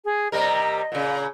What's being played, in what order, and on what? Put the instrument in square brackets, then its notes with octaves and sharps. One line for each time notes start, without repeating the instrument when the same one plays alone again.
[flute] G#4
[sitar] C3 G3 A#4 [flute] D#5
[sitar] A#2 C#3